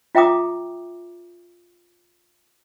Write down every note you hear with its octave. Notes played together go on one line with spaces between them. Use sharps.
F4 E5 G5 A#5 D6 D#6